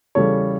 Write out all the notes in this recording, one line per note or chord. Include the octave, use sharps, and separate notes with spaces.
E2 C#3 G3 A4 C#5